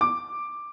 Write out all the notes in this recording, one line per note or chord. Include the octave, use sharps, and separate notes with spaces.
D6